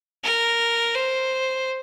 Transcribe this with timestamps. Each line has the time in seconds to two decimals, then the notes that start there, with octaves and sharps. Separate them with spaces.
0.24 A#4
0.95 C5